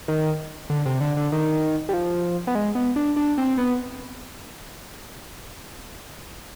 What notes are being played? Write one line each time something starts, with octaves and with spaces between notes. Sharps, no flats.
D#3
D3
C3
D3
D3
D#3
G3
F3
B3
G#3
B3
D4
D4
C4
B3